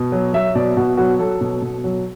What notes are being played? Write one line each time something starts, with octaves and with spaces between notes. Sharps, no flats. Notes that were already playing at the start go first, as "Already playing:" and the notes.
Already playing: B2
F#3
F#3 E5
B2 D5
B2 F#4
F#3 F#4
F#3 A4
B2
B2
F#3